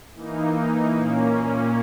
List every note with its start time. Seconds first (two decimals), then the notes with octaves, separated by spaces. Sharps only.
0.14 E3 A#3 D#4
0.93 A#2 A#3 C#4